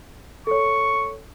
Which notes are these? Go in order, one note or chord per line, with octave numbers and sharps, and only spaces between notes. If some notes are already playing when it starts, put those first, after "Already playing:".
A4 C#5 C#6